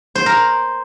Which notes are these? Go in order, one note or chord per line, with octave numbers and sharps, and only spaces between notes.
C5
A#4